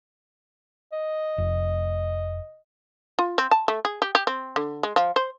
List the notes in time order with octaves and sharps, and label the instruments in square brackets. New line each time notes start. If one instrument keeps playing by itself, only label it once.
[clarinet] D#5
[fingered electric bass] F1
[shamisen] F4
C4
A5
A3
G#4
G4
G4
C4
D3
G#3
F3
C5